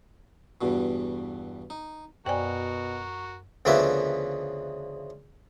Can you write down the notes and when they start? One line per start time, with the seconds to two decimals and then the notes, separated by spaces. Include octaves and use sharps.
0.61 E2 G2 B2
1.70 D#4
2.26 F#2 B2 F#4 A#4 C5 D5 G5 G#5
3.65 D2 C#3 F3 A#3 B3 E5